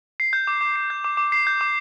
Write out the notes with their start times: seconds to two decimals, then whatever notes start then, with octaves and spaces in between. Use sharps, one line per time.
0.20 C7
0.33 G6
0.47 D6
0.61 D6
0.76 C7
0.90 G6
1.04 D6
1.17 D6
1.32 C7
1.47 G6
1.61 D6